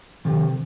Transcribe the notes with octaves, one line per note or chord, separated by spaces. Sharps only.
C3 D#3